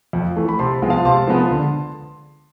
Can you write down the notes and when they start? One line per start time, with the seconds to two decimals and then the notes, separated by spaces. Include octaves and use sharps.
0.13 F2
0.36 E3 A3
0.49 B5
0.59 C3 A5 C6
0.82 F3 G#3 B3 F4
0.90 F5 A5
1.05 C3 A5 C6
1.28 F3 G#3 B3 F4
1.51 D3